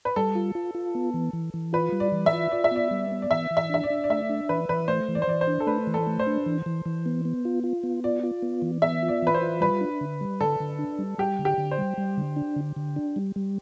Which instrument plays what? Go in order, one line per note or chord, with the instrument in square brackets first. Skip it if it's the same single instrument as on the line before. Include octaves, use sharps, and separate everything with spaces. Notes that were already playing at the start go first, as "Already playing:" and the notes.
[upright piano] B4
[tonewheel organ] G3 [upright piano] A4
[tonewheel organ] F4
F4
F4
B3
E3
E3
E3
[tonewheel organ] F4 [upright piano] B4
[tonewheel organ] G3
[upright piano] D5
[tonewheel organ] E3
[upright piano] E5
[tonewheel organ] F4
[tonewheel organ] F4 [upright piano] D5
[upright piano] E5
[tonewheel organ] B3 [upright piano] D5
[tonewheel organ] G3
B3
[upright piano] D5
[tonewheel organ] E3 [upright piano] E5
[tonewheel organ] E3
[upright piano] E5
[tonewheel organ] D4 [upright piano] E5
[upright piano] D5
[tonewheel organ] D4
[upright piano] D5
[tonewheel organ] A3 [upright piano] E5
[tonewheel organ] D4
[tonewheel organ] E3 [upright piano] B4
[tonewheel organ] E3 [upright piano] B4
[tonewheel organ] A3 [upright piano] C5
[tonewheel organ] E3
[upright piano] D5
C5
[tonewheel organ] E3 [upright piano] D5
[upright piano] C5
[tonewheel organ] D4
[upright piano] A4
[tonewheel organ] A3 [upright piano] B4
[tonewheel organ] E3
[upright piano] A4
[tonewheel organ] A3
[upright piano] C5
[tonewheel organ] D4
E3
E3
E3
B3
B3
F4
F4
B3
[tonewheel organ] F4 [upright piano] D5
[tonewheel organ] F4
B3
E3
[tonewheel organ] B3 [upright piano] E5
[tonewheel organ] F4
[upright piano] D5
[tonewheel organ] E3 [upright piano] B4
[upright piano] C5
[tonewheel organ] F4
[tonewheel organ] G3 [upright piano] B4
[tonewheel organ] D4
D3
G3
[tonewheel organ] D3 [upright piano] A4
[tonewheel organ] D3
D4
G3
[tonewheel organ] G3 [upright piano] G4
[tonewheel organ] D3
[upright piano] G4
[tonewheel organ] D3
[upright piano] C5
[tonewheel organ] G3
G3
D3
D4
D3
D3
D4
G3
G3